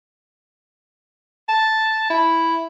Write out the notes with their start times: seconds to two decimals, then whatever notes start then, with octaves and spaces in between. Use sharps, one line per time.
1.49 A5
2.10 E4